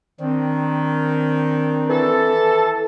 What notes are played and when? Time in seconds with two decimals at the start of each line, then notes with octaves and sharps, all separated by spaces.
0.20 D#3 C4 D4
1.90 E3 A4